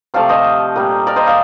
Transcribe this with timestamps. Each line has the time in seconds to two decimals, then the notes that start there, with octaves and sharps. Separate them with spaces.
0.14 C3 F3 A3 D5 F5
0.29 C5 D#5
0.76 A#2 G3
1.07 A#4 D5
1.16 C5 D#5
1.27 D5 F5